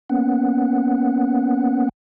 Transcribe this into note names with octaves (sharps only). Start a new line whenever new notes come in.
A#3 B3 C#4 F#5